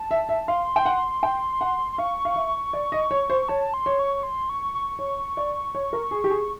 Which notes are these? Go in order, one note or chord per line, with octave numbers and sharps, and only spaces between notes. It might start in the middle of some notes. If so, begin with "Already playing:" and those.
Already playing: A5
E5
E5
F5 C6
G5
F#5
G5
F#5
C6
F5 C#6
F5
E5
D5
D#5
C#5
C5
C#5 A5
C6
C#5
C#6
C6
C#6
C#6
C#5
D5
C#5
A#4
G#4
G4
G#4